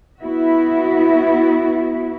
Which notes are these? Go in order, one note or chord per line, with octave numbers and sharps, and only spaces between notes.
B3 E4 F#4 E5